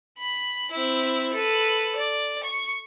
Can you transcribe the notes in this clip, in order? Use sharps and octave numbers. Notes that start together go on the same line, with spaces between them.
B5
C4 E4
A4 B4
D5
C#6